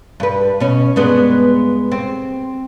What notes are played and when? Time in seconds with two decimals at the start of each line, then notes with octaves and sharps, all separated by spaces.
0.20 G2 B4
0.60 B2 C#4
0.96 G2 G#3 B3
1.92 C4